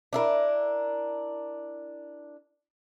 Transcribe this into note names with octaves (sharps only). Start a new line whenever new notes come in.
D4 E4 A#4